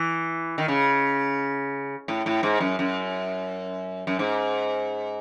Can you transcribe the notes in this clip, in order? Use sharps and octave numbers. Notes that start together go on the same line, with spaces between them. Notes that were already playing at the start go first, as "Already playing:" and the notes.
Already playing: E3
D#3
C#3
A2
A2
G#2
F#2
F#2
F#2
G#2